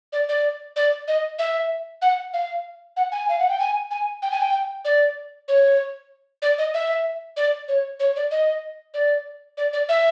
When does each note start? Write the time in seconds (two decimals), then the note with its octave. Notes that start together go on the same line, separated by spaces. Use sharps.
0.13 D5
0.29 D5
0.76 D5
1.08 D#5
1.39 E5
2.02 F#5
2.33 F5
2.97 F#5
3.12 G#5
3.29 F5
3.39 F#5
3.49 G5
3.60 G#5
3.91 G#5
4.22 G5
4.32 G#5
4.40 G5
4.85 D5
5.48 C#5
6.42 D5
6.58 D#5
6.74 E5
7.37 D5
7.68 C#5
8.00 C#5
8.16 D5
8.31 D#5
8.94 D5
9.57 D5
9.73 D5
9.89 E5